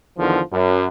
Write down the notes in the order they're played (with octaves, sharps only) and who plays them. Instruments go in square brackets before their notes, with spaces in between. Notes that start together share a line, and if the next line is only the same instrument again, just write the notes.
[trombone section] E2 D3 D#3 F3
F#2